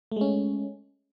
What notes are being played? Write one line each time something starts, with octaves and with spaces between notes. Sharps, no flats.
G#3 A3 C#4